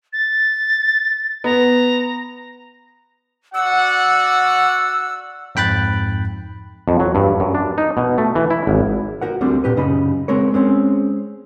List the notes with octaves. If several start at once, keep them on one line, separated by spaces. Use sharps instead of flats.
A6
B3 A#5
F#4 D5 F#5 E6
F2 G#2 G5 B5 F#6 A6
F2
F#3
G2
F#2
D4
D#4
B2
A3
E3
E4
G#1
F#4 A#4 F#5
D2 D3 G3 C4
A#2 G4 B4
F#2 C#3 D#4 D#5 B5
G#3 C4 A#4 C#5
G#3 C4 C#4 C6